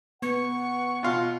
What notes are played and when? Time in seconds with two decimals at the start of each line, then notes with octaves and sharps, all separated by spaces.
0.22 B3 F#5 C#6
1.03 B2 F4